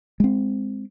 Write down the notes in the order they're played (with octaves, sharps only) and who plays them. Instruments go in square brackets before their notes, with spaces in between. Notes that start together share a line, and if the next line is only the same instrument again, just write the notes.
[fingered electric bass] G#3 C4